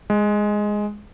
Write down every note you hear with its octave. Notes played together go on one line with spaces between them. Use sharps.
G#3